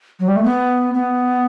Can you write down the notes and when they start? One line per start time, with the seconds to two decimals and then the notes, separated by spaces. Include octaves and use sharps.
0.20 F#3
0.28 G3
0.36 A3
0.44 B3
0.94 B3